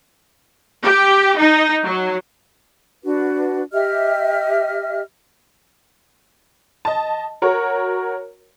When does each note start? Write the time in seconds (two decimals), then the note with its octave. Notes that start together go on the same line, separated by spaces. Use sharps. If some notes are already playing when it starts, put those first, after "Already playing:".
0.82 G4
1.37 D#4
1.83 F#3
3.04 D4 F#4 B4
3.72 G4 D#5 E5 F6
6.85 D#5 A5
7.42 F#4 A#4 C#5